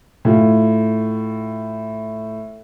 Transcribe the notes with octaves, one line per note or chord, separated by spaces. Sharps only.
A2 F4